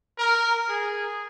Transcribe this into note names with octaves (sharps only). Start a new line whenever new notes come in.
A#4
G#4